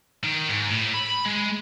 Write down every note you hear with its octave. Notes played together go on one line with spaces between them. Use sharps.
D#3
G#2
A2
B5
G#3